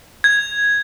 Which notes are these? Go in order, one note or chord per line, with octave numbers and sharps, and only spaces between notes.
G#6